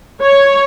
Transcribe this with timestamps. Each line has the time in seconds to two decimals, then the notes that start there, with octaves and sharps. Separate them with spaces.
0.21 C#5